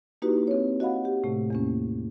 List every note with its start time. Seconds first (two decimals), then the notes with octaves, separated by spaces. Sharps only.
0.22 A#3 D#4 E4 F#4 G4 B4
0.47 C4 C#5
0.80 F#4 D#5 F5 F#5 B5
1.05 G4
1.24 A2 C3 A3
1.50 E2 A#3 C#4